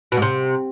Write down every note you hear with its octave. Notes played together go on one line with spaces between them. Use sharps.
B2
G#2
C3